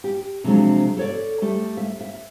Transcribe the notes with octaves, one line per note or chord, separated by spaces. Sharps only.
G4
C3 F3 F#3 G#3 D4
A4 C#5 D5
G3 A3
E5
E5